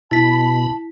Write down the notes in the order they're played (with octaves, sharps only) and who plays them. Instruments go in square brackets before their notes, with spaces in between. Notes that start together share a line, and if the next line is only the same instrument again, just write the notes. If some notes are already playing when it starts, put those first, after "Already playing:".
[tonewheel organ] B2 B5 [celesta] E4 B6 [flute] A5